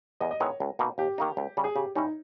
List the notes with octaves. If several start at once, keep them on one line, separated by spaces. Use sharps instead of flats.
E2 D#5
D#5
D#3 G#3 B3 E4 C#5
C#2
B2 A#3 D#4
D#2 G4
D#3 A#3 D#4
C#2
C#3 G3
G#4
C#3 G4
G3 C#4 D#4 E4